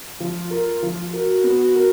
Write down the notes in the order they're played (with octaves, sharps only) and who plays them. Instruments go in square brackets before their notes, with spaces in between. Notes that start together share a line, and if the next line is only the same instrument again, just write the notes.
[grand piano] F3 [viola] F4
[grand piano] A#4
F3
[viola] F#4 [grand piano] A#4
[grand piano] B3
A#4